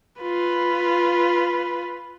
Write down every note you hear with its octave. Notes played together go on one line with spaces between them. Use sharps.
F4 B4